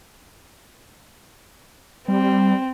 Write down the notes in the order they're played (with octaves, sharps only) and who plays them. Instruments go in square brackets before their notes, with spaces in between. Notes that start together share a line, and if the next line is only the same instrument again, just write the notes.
[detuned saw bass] G3 [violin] C4